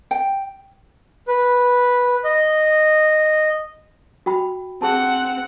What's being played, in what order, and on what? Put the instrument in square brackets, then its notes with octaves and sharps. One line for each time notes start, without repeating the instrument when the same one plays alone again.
[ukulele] G5
[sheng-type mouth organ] B4
D#5
[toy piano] F#4 G5 B5
[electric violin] C4 F#5 [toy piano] G#4 A5